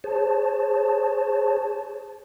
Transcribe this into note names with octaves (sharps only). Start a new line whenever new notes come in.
G#4 C5 C#5 A5